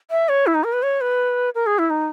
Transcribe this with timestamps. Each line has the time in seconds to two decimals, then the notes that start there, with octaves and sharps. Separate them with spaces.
0.11 E5
0.29 C#5
0.47 E4
0.55 D#4
0.64 A#4
0.73 B4
0.83 C#5
1.01 B4
1.55 A#4
1.66 G#4
1.79 E4
1.90 D#4